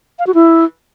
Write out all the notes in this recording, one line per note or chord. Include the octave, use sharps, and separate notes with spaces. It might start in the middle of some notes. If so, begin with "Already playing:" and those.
F5
F#4
E4